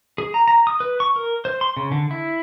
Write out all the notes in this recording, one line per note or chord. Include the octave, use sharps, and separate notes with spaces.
G#4
A#5
A#5
D#6
B4
C#6
A#4
C5
C6
C#3
D3
E4